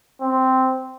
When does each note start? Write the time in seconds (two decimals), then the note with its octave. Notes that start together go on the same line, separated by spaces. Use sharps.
0.21 C4